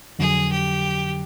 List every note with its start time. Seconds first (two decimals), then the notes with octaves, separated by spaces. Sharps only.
0.19 F2 D3 F#3 G#4
0.52 G4